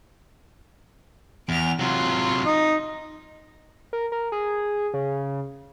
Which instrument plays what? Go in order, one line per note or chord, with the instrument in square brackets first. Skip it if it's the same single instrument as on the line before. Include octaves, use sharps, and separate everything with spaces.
[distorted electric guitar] E2 [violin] D7 F7
[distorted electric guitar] C3 F#3 [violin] F4
[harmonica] D#4
[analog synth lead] A#4
A#4
G#4
C#3